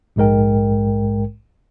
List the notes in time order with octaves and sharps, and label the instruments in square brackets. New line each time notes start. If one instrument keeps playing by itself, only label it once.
[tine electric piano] A#1 G#2 G#3 A#4 G5